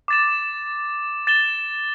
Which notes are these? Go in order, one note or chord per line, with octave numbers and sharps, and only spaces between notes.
D6 A6 E7
A6 E7 G7